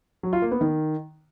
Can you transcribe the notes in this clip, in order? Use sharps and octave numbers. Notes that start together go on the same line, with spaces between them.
F#3
F4
A#3
B3
D#3